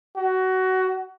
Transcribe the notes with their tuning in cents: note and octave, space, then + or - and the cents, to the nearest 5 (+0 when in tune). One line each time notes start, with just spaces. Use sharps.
F#4 +20